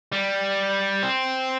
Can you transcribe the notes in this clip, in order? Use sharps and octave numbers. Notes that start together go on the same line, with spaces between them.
G3
C4